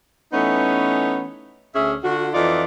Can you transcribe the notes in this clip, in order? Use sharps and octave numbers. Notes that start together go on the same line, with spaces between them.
E3 A3 B3 C#4 D#4
D2 C#4 G#4 E5
D3 F4 F#4
F2 E3 D#4 F4 D5